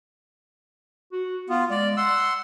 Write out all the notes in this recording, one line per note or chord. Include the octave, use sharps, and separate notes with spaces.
F#4
B3 F4
G#3 D5
F#5 C6 E6